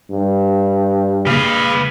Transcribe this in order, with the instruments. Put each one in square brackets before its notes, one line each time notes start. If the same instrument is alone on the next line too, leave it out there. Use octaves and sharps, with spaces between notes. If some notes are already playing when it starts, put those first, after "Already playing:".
[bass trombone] G2
[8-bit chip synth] C#3 A#3 [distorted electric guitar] B4 F5